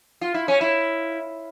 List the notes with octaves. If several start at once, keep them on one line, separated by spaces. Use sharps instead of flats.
F4
E4
C#4
E4